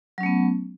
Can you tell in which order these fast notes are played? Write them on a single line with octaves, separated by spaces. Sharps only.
F#3 C#4 A3 B3